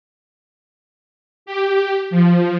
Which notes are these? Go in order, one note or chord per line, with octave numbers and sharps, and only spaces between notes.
G4
F3